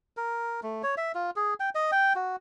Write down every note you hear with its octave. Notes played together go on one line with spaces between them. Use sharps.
A#4
A3
C#5
E5
F4
G#4
G5
D#5
G5
F#4